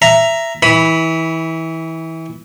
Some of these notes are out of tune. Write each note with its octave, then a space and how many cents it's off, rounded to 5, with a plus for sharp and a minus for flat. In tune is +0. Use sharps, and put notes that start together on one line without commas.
E5 +15 A#5 +0
E3 -25 B5 +0 D#6 +40